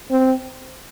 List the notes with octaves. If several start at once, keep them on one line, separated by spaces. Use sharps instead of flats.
C4